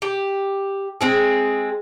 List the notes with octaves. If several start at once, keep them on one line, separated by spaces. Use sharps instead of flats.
G4
G#3 C4 G#4